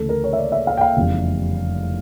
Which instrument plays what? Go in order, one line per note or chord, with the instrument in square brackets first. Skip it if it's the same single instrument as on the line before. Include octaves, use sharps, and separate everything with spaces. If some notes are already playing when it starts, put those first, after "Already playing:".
Already playing: [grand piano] D2 C#3 E3 A3 A4
A#4
C#5
E5
D5
E5
F5
G5
F5
F1 E2 C#3 G3